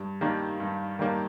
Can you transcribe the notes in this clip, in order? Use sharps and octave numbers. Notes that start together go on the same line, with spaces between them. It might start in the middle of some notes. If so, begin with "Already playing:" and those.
Already playing: G2
D#3 G3 A#3 D4
G2
D#3 G3 A#3 D4